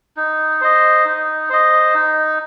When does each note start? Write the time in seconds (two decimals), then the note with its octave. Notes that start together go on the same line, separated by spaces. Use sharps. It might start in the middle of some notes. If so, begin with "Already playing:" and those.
0.17 D#4
0.61 C5 D#5
1.05 D#4
1.50 C5 D#5
1.94 D#4